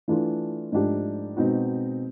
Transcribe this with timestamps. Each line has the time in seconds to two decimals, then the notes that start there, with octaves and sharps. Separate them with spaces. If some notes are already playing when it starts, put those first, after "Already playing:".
0.08 E3 A3 D4 F4
0.72 G#2 F3 A3 D4 G4
1.37 B2 G#3 C4 D#4 F#4